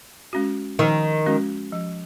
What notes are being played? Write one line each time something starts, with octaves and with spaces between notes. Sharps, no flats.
G#3 C#4 F#4
D#3 F3
G#3 C#4 F#4
F3